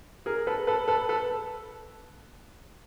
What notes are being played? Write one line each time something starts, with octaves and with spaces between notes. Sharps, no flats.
G#4 A#4
A4 B4
A4 B4
A4 B4
A4 B4